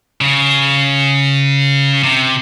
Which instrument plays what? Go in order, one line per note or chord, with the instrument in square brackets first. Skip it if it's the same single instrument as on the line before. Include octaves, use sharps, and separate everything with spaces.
[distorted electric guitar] C#3
C3